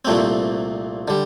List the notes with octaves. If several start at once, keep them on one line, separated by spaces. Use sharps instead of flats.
C2 A#2 A3 C4
D3 G3